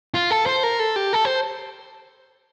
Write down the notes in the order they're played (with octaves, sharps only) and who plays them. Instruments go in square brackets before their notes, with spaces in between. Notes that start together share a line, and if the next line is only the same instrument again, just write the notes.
[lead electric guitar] F4
A4
C5
A#4
A4
G4
A4
C5